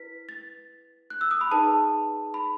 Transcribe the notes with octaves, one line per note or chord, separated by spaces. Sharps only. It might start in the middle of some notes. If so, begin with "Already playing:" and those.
Already playing: E4 B4 B6
A6
F#6
E6
D#6
B5
D#4 G#4 B4 A5
B5